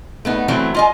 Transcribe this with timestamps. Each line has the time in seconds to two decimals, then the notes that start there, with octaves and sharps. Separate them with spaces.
0.25 A3 B3 D#4
0.48 E3 F#3 A3 B3 C4 E4
0.74 F4 D#5 G#5